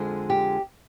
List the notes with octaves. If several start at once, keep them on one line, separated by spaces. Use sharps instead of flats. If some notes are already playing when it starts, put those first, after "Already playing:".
Already playing: F2 D3 F3 G#3
G4